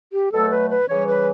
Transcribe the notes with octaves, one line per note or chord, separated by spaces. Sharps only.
G4
B2 F#3 A3 A4
B4
B4
C#3 E3 G3 C#5
B4